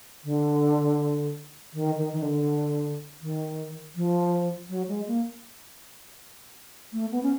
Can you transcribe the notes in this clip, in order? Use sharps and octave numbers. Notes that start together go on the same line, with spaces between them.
D3
D#3
D#3
D#3
D3
D#3
F3
F#3
G#3
A#3
A3
B3
C#4